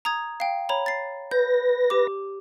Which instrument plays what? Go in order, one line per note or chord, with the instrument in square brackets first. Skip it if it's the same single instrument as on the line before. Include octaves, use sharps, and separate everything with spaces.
[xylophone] A#5 D#6 G#6
F5 G5
C#5 A#5 B5
A6 C7
[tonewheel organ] B4 A#6 [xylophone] G6
[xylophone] G4 D6